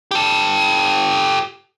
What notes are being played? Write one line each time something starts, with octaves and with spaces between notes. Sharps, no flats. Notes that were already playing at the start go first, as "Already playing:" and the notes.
G4 A4